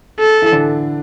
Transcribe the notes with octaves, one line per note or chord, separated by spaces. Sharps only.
A4
E3 E4
D3 D4